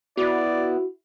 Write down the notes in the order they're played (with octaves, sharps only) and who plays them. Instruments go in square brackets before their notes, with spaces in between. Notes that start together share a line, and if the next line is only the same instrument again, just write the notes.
[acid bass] B3 [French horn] E4 [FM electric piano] F#4 [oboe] D5